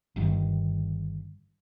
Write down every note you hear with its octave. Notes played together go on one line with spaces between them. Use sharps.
G1 G2 D#3